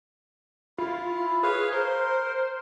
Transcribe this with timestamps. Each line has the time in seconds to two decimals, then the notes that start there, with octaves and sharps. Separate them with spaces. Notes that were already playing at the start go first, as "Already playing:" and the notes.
0.78 E4 F4
1.43 G#4 B4 C#5 F5
1.72 A#4 C5